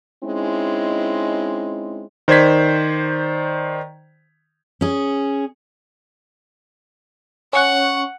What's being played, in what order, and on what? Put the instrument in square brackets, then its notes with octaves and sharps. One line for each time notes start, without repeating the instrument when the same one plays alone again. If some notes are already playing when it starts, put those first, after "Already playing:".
[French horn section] G#3 C4 C#4 D#4 E4
[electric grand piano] D#3 C5 D5 G#6 B6
[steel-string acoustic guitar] C#4 G#4
[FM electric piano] C#4 C#6 F#6 [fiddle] F#5